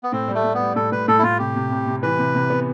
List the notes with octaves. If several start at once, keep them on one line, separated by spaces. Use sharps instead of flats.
B3
A2 C4
G3
A3
G3
B3
G3
A2 A4
A2 B4
A2 A4
E4
A2 F4
C3 G4
C3
C3
C3
E3 B4
C3
C3
B3